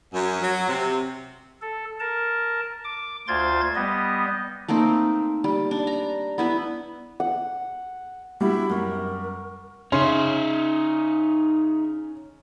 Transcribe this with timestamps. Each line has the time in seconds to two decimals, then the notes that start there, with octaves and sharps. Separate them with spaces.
0.13 F#2
0.41 F#3
0.69 C3
1.61 A4
2.00 A#4 A5
2.84 D6
3.28 D2 F4 C5 C6 G#6 A6
3.75 G3 B3 D#5
4.68 A3 A#3 C4 D#4
5.44 G3
5.71 D4
5.87 A#5
6.38 B3 E4 B4
7.20 F#5
8.41 G3 B3 D4 E4 F#4 F#5
8.70 F#2 A#4 F#5 C#6
9.92 C#3 C#4 D#4 E5 C6